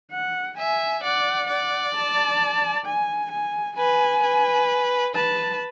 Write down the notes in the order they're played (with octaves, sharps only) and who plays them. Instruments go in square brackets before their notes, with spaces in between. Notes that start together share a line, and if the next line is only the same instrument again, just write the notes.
[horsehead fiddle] F#5
[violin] E5 [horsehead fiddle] G#5
[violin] D5 [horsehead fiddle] F#5
[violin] D5
[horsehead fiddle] A5
G#5
G#5
[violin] B4 [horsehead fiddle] G#5
[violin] B4
[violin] B4 [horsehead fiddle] A5